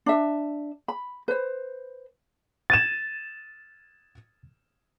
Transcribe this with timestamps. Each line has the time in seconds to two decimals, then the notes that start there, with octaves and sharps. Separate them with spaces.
0.06 D4 E5
0.88 B5
1.28 B4 C5
2.70 G#6 A6 D#7 E7